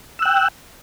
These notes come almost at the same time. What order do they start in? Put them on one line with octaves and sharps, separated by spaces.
E6 F#6 G5